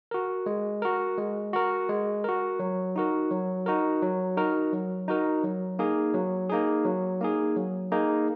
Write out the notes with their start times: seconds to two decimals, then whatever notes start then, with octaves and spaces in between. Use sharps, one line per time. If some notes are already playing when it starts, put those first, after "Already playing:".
0.11 F#4 A#4
0.46 G#3
0.82 F#4 A#4
1.18 G#3
1.53 F#4 A#4
1.89 G#3
2.24 F#4 A#4
2.59 F#3
2.96 D#4 F#4 A#4
3.31 F#3
3.66 D#4 F#4 A#4
4.02 F#3
4.37 D#4 F#4 A#4
4.73 F#3
5.08 D#4 F#4 A#4
5.44 F#3
5.79 A#3 D#4 G#4
6.14 F#3
6.49 A#3 D#4 G#4
6.85 F#3
7.21 A#3 D#4 G#4
7.56 F#3
7.92 A#3 D#4 G#4